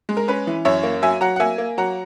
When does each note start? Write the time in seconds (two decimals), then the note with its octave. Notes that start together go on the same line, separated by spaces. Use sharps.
0.09 G#3
0.17 A#4
0.28 C#4 B4
0.47 E3
0.65 F#2 C#5 E5
0.83 A#3
1.02 F#3 E5 G#5
1.21 F#3 F#5 A#5
1.36 F#5
1.40 A#3 E5 G#5
1.58 A#3
1.78 F#3 F#5 A#5